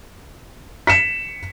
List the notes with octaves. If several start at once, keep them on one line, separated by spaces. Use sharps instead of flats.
B6 C#7 E7